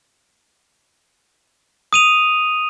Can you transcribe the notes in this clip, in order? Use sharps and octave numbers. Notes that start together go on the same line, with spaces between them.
D#6 D#7 F7